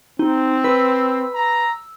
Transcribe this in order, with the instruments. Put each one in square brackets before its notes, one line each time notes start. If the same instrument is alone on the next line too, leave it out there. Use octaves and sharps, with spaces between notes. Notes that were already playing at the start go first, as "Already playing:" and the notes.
[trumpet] C4 [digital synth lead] D#4
[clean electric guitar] B4 [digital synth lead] E6
[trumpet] A#5